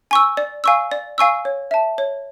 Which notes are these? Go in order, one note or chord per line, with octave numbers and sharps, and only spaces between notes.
G#5 C#6 E6
D5
F5 G#5 C#6 E6
D5
F5 G#5 C#6 E6
C#5
E5 A5
C#5